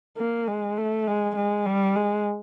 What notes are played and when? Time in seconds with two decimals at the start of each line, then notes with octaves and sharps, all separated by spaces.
0.18 A#3
0.48 G#3
0.78 A3
1.07 G#3
1.36 G#3
1.66 G3
1.96 G#3